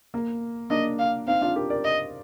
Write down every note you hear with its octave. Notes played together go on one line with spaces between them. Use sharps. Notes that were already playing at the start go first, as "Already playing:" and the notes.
A#3
A#3 D4 D#5
F5
C4 D#4 F5
D4 F4
G4 A#4
A#4 D5
D#5